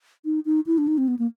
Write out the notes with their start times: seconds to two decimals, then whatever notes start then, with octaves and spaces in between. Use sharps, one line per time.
0.25 D#4
0.45 D#4
0.67 E4
0.78 D4
0.88 D#4
0.98 C4
1.08 B3
1.19 A#3